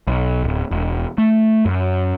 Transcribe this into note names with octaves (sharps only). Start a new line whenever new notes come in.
B1
D1
E1
A3
F#2